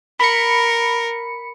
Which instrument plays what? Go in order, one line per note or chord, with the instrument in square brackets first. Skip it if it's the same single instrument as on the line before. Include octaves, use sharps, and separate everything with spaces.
[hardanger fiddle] A#4 [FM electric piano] B5 C#7